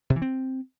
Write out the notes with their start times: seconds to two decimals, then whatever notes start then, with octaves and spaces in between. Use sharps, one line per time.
0.10 C3
0.16 E3
0.22 C4